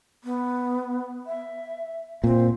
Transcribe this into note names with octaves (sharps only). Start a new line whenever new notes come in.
B3
E5
A#2 C4